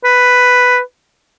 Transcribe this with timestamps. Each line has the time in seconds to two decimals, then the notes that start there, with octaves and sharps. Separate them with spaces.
0.04 B4